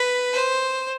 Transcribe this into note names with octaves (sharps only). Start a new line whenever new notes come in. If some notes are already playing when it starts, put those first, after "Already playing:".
Already playing: B4
C5